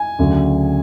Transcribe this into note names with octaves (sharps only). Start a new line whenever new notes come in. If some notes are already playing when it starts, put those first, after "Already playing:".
Already playing: G#5
D2 C#3 F#3